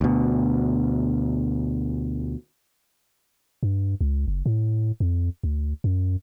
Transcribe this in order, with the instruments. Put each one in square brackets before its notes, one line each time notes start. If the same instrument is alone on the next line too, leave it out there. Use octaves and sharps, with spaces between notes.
[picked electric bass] D2 B2
[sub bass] G2
C#2
F#1
A2
F2
D2
F#2